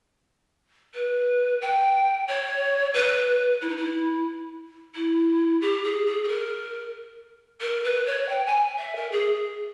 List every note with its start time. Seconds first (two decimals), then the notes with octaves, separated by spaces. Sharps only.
0.94 B4
1.61 G5
2.27 C#5
2.93 B4
3.61 E4
3.68 D#4
3.76 E4
4.94 E4
5.61 G4
5.83 G#4
6.05 G#4
6.23 G#4
6.28 A#4
7.61 A#4
7.84 B4
8.05 C#5
8.28 G5
8.45 G#5
8.78 E5
8.95 A#4
9.11 G#4